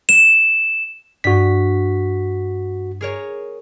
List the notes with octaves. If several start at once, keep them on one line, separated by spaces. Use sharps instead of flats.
E7
G2 F#4 B6
G#4 A#4 C#5